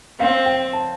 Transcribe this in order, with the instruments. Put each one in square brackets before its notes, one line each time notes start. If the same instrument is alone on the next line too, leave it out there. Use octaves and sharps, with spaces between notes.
[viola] C4 [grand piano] F5
[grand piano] G5
A5